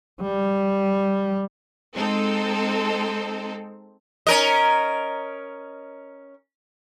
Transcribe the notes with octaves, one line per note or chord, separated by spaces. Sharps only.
G3
G#3 C4 D#4 A4
C#4 A#4 D#5